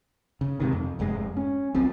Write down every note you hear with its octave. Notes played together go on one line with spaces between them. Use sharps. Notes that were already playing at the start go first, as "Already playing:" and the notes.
C#3
G#2 C3 D#3
F2
F1 F2 G#2 G#3
C#4
B1 B2 F3 C4